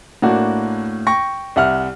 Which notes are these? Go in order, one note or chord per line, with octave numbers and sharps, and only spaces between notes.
A2 A#3 D4 F#4
G5 C#6 A#6
C2 E5 F#5 F6